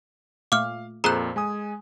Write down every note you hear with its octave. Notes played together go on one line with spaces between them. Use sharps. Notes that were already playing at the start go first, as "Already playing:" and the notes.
A#2 A3 F5 D6 F6
F2 A#2 G#4 A4 C5 A#5 F#6
G#3 G#5 D#6